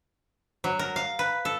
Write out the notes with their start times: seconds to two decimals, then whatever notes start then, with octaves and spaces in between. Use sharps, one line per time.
0.64 F#3
0.79 A#4
0.96 F5
1.19 B4
1.45 A4